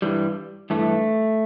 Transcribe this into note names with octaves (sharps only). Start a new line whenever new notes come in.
G2 E3 G3
G2 E3 A3